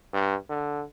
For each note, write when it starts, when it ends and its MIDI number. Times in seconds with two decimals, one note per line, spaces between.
0.13 0.35 43
0.49 0.84 50